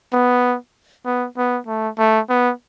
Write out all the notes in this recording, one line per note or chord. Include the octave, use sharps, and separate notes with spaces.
B3
B3
B3
A3
A3
B3